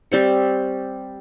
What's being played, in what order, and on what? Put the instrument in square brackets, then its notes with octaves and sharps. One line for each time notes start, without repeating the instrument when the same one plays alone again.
[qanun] G3 C4 C#6